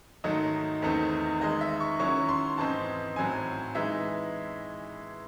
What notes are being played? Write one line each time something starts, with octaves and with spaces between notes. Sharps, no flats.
G#2 D#3 F#3 A3 D#4 D#5
E2 D#3 A3 C4 D#4
D#3 G#3 D#4 D#5
E5
C#6
D#3 F#3 C#4 E4 C#6
C6
G#2 E3 C4 D#4 A5
A2 F#3 C4 G#5
E3 G#3 D#4 E5